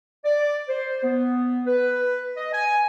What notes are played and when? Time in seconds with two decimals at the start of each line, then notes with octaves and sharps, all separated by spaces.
0.25 D5
0.68 C5
1.03 B3
1.67 B4
2.37 D#5
2.52 G#5